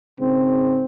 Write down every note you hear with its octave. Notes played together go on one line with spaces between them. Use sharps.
G#2 C#3 C4